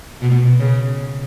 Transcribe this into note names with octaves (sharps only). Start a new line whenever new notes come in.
B2
C#3